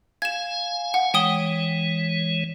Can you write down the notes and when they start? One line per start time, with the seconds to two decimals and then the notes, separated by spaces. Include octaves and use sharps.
0.22 F5 G#5 G#6 E7
0.94 F#5
1.14 E3 G#3 C#5 G5 D#6 G7